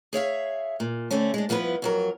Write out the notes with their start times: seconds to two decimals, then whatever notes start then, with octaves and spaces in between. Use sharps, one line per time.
0.13 G#4 C#5 E5 F5
0.80 A#2
1.11 D3 A3 C4 C#4
1.34 G#3 D4
1.49 G2 F3 B3 E4 B4
1.82 F2 F#3 A#4